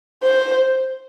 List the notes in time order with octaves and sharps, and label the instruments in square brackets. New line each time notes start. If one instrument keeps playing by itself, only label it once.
[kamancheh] C5